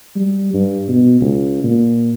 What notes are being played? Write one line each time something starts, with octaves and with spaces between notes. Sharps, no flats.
G3
G2
B2
C#2
A#2